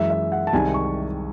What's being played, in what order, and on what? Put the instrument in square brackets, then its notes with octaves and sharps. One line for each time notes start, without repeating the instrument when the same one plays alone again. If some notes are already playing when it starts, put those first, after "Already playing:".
Already playing: [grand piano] F#2 E3 G#3 E5
E5
F#5
A5
C2 C3 D#3 G#3 G#5
C#6